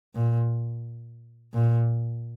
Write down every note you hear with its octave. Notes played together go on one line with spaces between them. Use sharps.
A#2
A#2